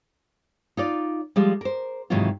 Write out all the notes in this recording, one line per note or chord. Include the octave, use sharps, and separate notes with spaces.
D#4 F4 D5
F3 G3 G#3
A#4 C5
G#2 C3 D#3 E3 F#3 F4